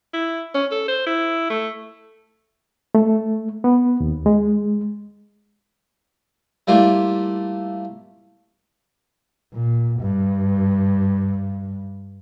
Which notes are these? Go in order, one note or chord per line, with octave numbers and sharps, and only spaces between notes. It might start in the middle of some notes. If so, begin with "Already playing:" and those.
E4
C#4
A4
C5
E4
A3
A3
B3
D#2
G#3
G3 A3 A#3 E4 F4
A#2
G2